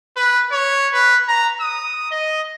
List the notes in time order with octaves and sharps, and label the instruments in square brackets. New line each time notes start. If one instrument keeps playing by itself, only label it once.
[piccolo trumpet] B4
C#5
B4
A#5
D#6
D#5